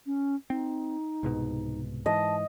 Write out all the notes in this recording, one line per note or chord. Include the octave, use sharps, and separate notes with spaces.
C#4
C4 D#4
C2 G#2 B2
G#2 E3 D#5 A5